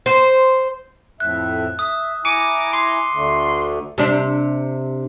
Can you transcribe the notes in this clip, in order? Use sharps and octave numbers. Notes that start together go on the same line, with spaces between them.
C5
F2 A2 E5 F#6
E5 D#6
E4 G#5 A#5 D6 C#7 D#7
C6 D6
D2 D3 A3
C3 D4